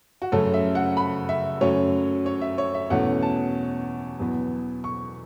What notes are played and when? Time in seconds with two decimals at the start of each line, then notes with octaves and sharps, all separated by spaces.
0.22 F#4
0.32 F#2 C#3 A3 C#4 A4
0.54 E5
0.75 F#5
0.97 B5
1.29 E5
1.61 F#2 F#3 A3 C#4 C#5
2.26 C#5
2.41 E5
2.58 C#5
2.74 E5
2.90 E2 B2 A3 C#4 F#5
3.23 A5
4.19 E2 B2 F#3 B3
4.84 C#6